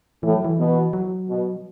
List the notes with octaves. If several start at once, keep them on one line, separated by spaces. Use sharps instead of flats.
A2 E3
F#3
E3
B2
F#3
B2